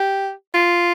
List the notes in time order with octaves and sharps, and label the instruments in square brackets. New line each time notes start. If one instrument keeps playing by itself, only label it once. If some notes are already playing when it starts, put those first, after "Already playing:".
Already playing: [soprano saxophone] G4
F4